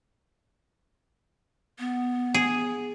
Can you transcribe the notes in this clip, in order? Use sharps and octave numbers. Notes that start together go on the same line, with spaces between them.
B3
G#4